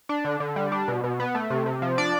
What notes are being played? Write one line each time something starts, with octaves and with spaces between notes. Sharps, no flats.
D4
D3
D3
G3
D4
B2
B2
B3
A3
C3
C3
F3
D4 D5